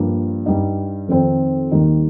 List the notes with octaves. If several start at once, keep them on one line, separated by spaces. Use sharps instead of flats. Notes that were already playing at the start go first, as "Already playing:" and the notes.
Already playing: G2 F3 A#3
G2 G3 D#4
F2 D#3 C4 D#4
D#2 D#3 G3 D#4